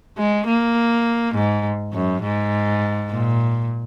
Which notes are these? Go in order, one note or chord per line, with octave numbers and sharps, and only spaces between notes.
G#3
A#3
G#2
F#2
G#2
A#2